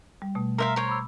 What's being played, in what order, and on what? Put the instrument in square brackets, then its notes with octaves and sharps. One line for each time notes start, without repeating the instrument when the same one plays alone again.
[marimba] G3
B2 A3
[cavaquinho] A#4 E5 F5 [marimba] A#5 C6
[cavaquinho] A#4 C5 C#5
[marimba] B5 D6 E6